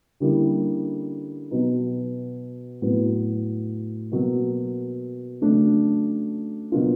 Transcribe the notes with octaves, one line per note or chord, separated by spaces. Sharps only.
D3 G3 A#3 C#4 E4
B2 F#3 B3 D#4
A2 F#3 B3
B2 F#3 A#3
C#3 F#3 A3 D4
B2 F#3 A#3 D4 F4